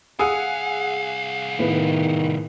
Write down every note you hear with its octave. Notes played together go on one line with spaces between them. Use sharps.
C2 G#4 F5 F#5 D#6 E6 D#7
A2 D#3 B3